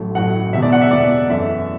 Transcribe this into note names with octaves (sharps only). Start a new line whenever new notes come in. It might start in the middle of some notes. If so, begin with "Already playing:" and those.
Already playing: A1 A2 F#3 A3
A1 A2 F#3 A3 F#5
E1 E2 B2 E5
D5
F#5
E5
E1 E2 B2 D5
F#2 E3 A3 E5